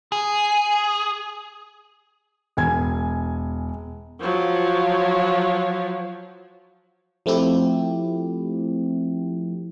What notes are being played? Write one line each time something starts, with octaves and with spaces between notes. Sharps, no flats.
G#4
E1 G#5 G#6
F3 F#3
F3 A3 C4 E4 G4